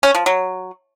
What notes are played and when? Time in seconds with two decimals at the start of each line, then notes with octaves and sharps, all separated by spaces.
0.03 C#4
0.15 F3
0.26 F#3